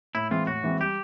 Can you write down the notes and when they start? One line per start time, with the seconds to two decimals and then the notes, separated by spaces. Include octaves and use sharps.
0.15 A2 E4
0.31 E3 G#3 C4 F4
0.47 A2 F#4
0.63 E3 G#3 C4
0.80 G3 G4